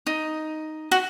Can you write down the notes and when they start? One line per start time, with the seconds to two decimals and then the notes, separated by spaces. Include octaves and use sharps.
0.07 D#4
0.91 F#4